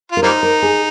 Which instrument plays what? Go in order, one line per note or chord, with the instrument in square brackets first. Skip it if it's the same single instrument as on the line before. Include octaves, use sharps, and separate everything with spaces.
[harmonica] F4
[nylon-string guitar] A#4
[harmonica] G3 A#3 D#4 [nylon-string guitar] C5
[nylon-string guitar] A#4
G#4